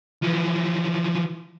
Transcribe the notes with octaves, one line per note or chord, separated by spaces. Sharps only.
E3 F3